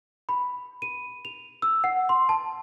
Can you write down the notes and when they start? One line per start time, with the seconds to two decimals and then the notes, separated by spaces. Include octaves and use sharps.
0.29 B5
0.82 D#7
1.25 F7
1.62 E6
1.84 F#5
2.09 C6
2.29 A5